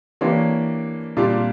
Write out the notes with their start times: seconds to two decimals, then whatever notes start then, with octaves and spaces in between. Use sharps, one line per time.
0.21 E3 A#3 D4 G4 C#5
1.17 A#2 G3 D4 F4